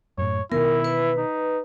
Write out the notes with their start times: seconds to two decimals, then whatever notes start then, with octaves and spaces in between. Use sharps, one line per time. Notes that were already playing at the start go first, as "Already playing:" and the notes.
0.18 F#2 A2 C#5
0.52 B2 D#3 B3 E4 A#4
0.84 B4
1.18 D#4